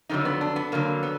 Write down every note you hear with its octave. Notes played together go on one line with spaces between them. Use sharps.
F2 D3 F#3 D#4
B3
D4
B3
F2 D3 F#3 A#3
B3